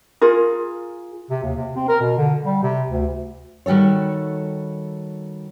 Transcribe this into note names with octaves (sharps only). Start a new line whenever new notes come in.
F4 G#4 A#4
C3
D#2
C3
C4
A#4
B2
D3
G3
C3
D2
D#3 G3 F#4 A4 C#5